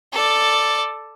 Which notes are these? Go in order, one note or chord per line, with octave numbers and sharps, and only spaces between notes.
A4 D5